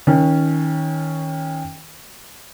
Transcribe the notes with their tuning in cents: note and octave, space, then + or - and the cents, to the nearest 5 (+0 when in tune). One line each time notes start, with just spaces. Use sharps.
D#3 +25 C#4 +0